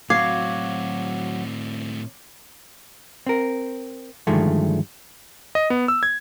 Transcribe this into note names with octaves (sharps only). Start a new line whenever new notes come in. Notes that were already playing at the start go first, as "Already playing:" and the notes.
A2 F#3 C4 F#4 F5 D6 G#6
C4 A#4
G2 D3 D#3 F3 G#3 A3
D#5
B3
E6
G#6